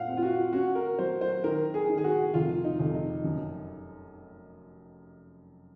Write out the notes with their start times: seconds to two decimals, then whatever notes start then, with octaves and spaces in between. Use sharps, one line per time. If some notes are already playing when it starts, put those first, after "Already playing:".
Already playing: A#2 F5 F#5
0.08 C4
0.17 F4
0.23 F#4
0.53 C#4 F#4
0.75 A#4
0.98 F#3 C5
1.21 C5
1.44 D#3 A#4
1.74 G#4
1.89 D#3
1.98 G#4
2.04 F#4
2.34 F1 F4
2.64 D#4
2.79 F1
2.94 D#4
3.24 F#2